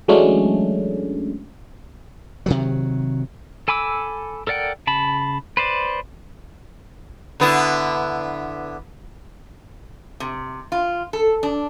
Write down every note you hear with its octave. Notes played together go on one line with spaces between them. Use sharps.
E3 F#3 G#3 A3 C#4 D4
C3 D#3 F#3
A4 G#5 B5 D6 E6
A4 A#4 D5 F#5 G5
C#3 A5 B5
B4 C5 D5
D3 B3 E4
C3
F4
A4
D4